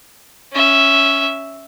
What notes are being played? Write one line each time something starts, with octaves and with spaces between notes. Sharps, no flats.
C#4 E5